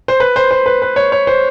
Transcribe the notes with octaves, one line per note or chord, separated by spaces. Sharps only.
C5
B4
C5
C5
B4
B4
C#5
C#5
C5